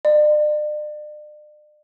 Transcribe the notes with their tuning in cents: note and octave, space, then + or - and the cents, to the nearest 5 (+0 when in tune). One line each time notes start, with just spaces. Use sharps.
D5 +40